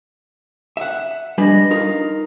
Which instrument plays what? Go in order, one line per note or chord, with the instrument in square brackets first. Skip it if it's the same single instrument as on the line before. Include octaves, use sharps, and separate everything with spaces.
[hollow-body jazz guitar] E5 F#5
[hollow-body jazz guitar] G3 G#4 B4 [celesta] D4 D#5 A#6
[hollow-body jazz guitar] D#4 F4 A#4